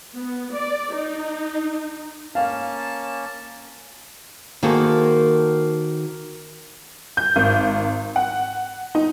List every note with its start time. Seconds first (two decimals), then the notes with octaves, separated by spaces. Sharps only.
0.15 B3
0.55 D5
0.95 D#4
2.35 A#3 C#4 F5 A5
4.63 D#3 A#3 F#4 G#4 A4 C5
7.17 G6
7.36 G#1
8.16 F#5
8.95 D#4